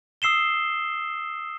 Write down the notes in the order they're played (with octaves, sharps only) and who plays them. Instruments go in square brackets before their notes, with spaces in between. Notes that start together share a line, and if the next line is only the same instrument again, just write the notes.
[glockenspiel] D#6 E6 C7 E7 G7